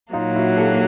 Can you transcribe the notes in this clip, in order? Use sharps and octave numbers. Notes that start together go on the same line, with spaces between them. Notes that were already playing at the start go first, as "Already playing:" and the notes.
A#2 F#3 A#3 D#4 F4
E4 F#4
G4 A4